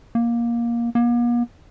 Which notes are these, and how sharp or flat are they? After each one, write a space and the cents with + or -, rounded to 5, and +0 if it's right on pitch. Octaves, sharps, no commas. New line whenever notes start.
A#3 +15
A#3 +45